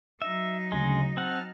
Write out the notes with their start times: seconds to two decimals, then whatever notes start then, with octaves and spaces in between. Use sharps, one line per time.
0.22 F#3 D#4 E5
0.72 D2 C#3 G#3
1.17 C4 F#5 A5 F6